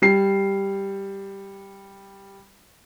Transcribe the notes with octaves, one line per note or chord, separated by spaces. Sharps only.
G3 C7